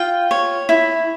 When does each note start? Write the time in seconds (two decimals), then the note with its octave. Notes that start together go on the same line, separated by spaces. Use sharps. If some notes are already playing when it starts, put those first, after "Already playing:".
Already playing: F4 G5
0.31 C#5
0.69 E4